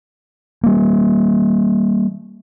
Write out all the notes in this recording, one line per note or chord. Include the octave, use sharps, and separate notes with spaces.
G3 A#3